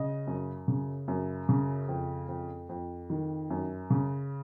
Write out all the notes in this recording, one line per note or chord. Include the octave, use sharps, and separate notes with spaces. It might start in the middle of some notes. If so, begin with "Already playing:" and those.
Already playing: C#3 D#5
F#2
C#3
F#2
C#3
F2
F2
F2
D#3
F#2
C#3